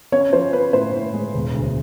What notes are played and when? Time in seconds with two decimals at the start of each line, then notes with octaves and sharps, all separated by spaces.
0.12 C#4 C#5
0.33 F3 C5
0.53 C#4 B4
0.73 A2 C5
0.94 A2
1.14 G#3
1.34 E1
1.55 D2